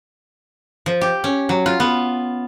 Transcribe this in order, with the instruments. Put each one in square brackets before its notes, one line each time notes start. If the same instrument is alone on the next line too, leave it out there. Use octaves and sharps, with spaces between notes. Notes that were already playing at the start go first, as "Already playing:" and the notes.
[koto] F3
G4
C#4
F#3
F4
B3